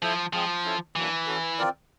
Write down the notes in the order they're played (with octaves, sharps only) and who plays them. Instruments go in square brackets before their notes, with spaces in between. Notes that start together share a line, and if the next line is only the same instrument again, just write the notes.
[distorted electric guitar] F3 [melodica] E4 A4 C5 E5
[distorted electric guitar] F3 [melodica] G#3 C4 F4 G#4
[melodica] C#4 E4 A4
[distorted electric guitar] E3 [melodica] F#3 A#3 D4
[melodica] C#4 F#4 A4
C4 F4 A#4 D5